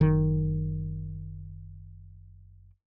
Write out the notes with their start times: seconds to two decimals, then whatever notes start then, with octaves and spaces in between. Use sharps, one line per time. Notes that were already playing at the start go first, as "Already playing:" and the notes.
0.01 F#1 D#3